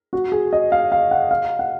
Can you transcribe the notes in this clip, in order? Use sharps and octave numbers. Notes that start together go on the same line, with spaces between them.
F#4
G#4
D#5
F5
F5
F#5
F5
F#5